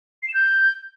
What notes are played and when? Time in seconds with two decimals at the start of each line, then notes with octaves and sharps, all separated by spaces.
0.23 C7
0.28 E7
0.34 G6